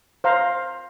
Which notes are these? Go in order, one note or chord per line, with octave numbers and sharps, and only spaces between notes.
C5 F5 A#5